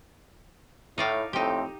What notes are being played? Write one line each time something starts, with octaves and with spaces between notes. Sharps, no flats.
A2 D#4 D5 F5
F2 A2 C4 D#4 G4